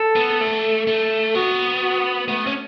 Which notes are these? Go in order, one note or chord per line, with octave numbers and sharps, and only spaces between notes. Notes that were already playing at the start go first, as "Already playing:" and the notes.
Already playing: A4
B3
A3
A3
B3 F#4
F#4
A3 B3
C#4